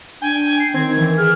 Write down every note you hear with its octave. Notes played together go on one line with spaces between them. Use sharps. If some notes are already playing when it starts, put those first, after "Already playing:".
D4 G5 G#5
C7
D#3 C4 G#6
E3
G#4 F6